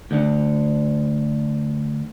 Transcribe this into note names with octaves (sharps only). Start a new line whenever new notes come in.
D2 D3